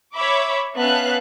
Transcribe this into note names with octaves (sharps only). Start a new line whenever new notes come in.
C#5 E5 B5 D6
B3 C#4 E5 F5 A5 F#6